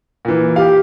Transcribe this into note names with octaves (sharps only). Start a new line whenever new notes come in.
A#2 E3
G4 F5